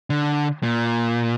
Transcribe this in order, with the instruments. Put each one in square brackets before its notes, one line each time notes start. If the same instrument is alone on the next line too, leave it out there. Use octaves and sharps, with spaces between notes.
[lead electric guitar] D3
A#2